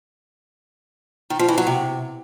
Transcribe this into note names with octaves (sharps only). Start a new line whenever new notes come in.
D#3
F3
E3
F#3
C3